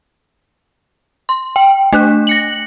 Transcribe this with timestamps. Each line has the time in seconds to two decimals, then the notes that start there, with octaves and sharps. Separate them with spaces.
1.29 C6
1.56 G5
1.93 A3 D4 F#6
2.27 A#6 C#7 F#7